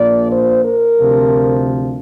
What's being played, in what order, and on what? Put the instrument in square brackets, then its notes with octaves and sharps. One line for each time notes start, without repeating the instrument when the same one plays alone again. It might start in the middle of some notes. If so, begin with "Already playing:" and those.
Already playing: [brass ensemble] A#1 A#2 F3 D5
C5
A#4
D2 C3 F3